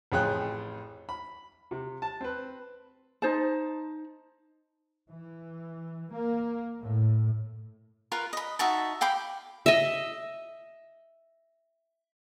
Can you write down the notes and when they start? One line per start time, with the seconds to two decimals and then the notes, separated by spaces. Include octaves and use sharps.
0.12 A1 F2 G#4 G5 F#6
1.09 B5
1.71 C3
2.02 A5
2.21 C4 B4
3.22 D#4 C5 A5
5.11 E3
6.13 A#3
6.81 A2
8.12 F4 A#4 B4
8.33 D#5 B5
8.59 D#4 F#4 E5 A5
9.01 F5 G5 B5 D6
9.66 D#5 E5